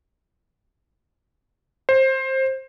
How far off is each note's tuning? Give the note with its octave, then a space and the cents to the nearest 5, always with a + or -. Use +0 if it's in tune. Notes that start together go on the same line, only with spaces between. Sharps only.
C5 +20